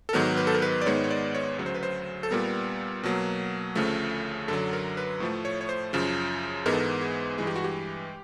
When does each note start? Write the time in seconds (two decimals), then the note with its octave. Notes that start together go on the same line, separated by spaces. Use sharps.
0.09 A4
0.13 G#2 D#3 F#3 B3 A#4
0.37 B4
0.47 A4
0.55 A#4
0.62 B4
0.82 D5
0.86 G#2 D#3 G#3 B3 C#5
1.04 C#5
1.10 D5
1.35 C#5
1.58 D2 C#3 F#3 C#5
1.66 C5
1.75 B4
1.83 C5
2.23 A4
2.31 A#2 G3 B3 A#4
3.03 B2 F#3 A#3
3.75 D2 C#3 F3 A3
4.48 F#2 D3 F#3 A4
4.73 A#4
4.97 B4
5.20 A2 F3 A3
5.45 C#5
5.61 C#5
5.69 C5
5.93 F#2 C#3 F3
6.66 G#2 E3 G#3 B3 A#4
6.73 A4
6.80 A#4
7.01 G#4
7.38 G2 E3 G#3 G#4
7.47 G4
7.56 F#4
7.64 G4